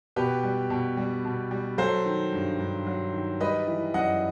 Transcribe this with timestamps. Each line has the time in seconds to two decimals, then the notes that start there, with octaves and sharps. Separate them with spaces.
0.16 B2 G4 B4
0.43 G3
0.70 B2
0.97 G3
1.25 B2
1.51 G3
1.78 F#3 A4 C5
2.05 D#3
2.33 G2
2.59 G2
2.86 F#3
3.13 D#3
3.40 G3 B4 D#5
3.67 E3
3.94 F#2 D#5 F#5